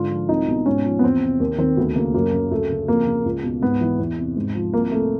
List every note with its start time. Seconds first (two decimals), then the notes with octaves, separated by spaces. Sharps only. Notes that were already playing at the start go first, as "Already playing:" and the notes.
Already playing: G#2 D3 F4
0.11 F3
0.29 C2 D#4
0.48 B2
0.66 G#2 C#4
0.84 F3
0.99 B3
1.04 E2 C4
1.21 C3
1.40 D#2
1.58 D#3 C4
1.77 D2 B3
1.96 C#3 A#3
2.14 F#2 A#3
2.33 C#3
2.51 D2 A3
2.70 C#3
2.88 F2 A#3
3.06 C#3
3.26 C#2
3.43 B2
3.61 G#2 B3
3.81 E3
3.99 E2
4.18 C3
4.37 G#2
4.55 F3
4.74 C2 A#3
4.91 C3 A3